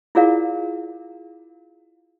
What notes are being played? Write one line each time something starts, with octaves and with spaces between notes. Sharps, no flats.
E4 F4 G#4 A#4 D5 F5